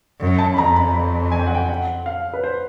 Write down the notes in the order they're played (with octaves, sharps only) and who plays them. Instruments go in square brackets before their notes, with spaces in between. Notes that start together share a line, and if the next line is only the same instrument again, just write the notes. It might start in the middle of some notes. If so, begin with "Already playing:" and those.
[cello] F#2
[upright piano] A5
B5
[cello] F2 [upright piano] A#5
[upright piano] B5
B5
G#5
G5
F#5
G5
F#5
F5
B4
C5